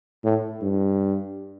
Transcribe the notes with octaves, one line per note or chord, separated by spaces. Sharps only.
A2
G2